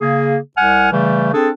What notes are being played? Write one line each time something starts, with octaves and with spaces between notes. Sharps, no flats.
C#3 A#3 G#4
C2 F#5 G#5 F6
C#3 E3 G3 A3
C4 D4 G#4 A4